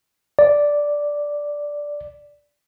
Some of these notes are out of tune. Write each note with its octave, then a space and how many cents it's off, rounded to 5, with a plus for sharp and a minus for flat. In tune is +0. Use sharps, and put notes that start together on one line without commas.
D5 -5